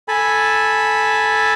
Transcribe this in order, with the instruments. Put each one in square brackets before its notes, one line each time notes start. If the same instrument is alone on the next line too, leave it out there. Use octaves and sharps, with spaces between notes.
[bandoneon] A4 G#5 A5 B5